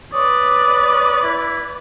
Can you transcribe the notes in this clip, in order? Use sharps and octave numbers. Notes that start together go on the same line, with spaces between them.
B4 C#5 D5 D#6
E4